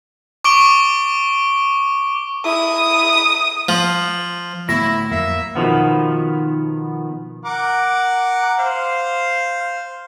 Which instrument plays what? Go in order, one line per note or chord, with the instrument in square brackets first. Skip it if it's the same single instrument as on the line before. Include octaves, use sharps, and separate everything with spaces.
[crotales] C#6 D6 D7 G7
[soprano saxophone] E4 [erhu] D#6
[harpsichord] F3
[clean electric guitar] A2 F#3 [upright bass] D3 B3 [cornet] E4 [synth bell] A#6
[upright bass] F2 F#3 [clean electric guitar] A#3 [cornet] E5
[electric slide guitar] B2 D#3 F3 B3
[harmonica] A#4 F#5 D6
C5 F5